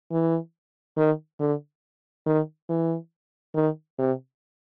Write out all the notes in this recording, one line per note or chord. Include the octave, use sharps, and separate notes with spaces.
E3
D#3
D3
D#3
E3
D#3
C3